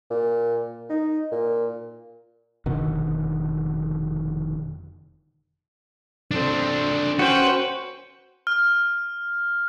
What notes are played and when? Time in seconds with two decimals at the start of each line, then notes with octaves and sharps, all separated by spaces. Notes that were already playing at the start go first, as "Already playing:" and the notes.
0.10 A#2
0.90 D#4
1.32 A#2
2.66 F1 B2 D3 D#3
6.31 C4 D4 A4 C5
7.19 C#4 F#4 B4 C5 G5
8.47 F6